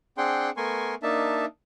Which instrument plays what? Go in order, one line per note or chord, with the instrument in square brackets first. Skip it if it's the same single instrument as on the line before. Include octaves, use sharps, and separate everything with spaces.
[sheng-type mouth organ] C4 D4 G#4 F#5 G5 C6
A3 B3 A#4 G#5 C6 C#6
A#3 D4 D#4 E5 A5